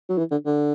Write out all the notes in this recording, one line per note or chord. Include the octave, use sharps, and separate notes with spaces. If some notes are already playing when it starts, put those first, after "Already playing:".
F#3
E3
D3
D3